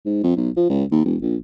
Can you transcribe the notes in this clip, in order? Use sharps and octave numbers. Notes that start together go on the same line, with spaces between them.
G#2
F2
B1
F3
C#2
D#2
E1
A#1